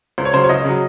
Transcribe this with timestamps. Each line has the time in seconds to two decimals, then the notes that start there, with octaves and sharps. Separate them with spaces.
0.18 C#2 C5
0.25 C#5
0.34 C#3 F#3 C5
0.44 C#5
0.49 C#2 D#5
0.65 C#3 F#3